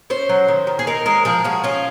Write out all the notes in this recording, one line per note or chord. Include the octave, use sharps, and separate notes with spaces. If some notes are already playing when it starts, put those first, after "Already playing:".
C#4 C5
F#3
D#3
D#3
G#4
D#4 A#4
G#3 A#4
F3 G#4
F3 F#4
C#4 F4